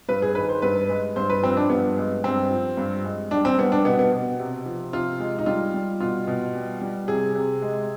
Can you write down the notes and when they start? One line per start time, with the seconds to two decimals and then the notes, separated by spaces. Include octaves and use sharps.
0.09 G2 B4
0.22 G#4
0.35 D#3 B4
0.49 C5
0.62 G2 B4
0.89 G#3
1.16 G2 C5
1.30 B4
1.43 F3 C4
1.57 D4
1.69 G2 B3
1.97 G#3
2.24 G2 C4
2.51 F3
2.77 G2
3.05 G#3
3.31 G3 D4
3.45 C4
3.58 G3 B3
3.72 D4
3.85 B2 B3
3.99 B3
4.12 B2
4.39 C3
4.66 F3
4.93 C3 F4
5.20 G#3
5.39 D#4
5.46 G3 F4
5.74 G3
6.00 B2 F4
6.27 B2
6.54 G3
6.81 G3
7.08 C3 G#4
7.35 C3
7.62 G#3